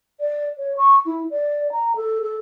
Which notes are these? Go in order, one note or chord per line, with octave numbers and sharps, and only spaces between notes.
D5
C#5
C#6
E4
D5
A#5
A4
A4